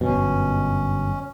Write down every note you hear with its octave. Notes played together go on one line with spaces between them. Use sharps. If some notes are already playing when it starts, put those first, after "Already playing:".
G1 F#2 B2 C#4